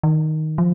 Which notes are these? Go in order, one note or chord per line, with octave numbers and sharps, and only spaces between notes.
D#3
F3